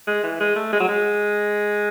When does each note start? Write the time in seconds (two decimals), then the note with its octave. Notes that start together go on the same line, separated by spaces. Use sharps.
0.07 G#3
0.23 E3
0.40 G#3
0.56 A3
0.73 G#3
0.80 F#3
0.88 G#3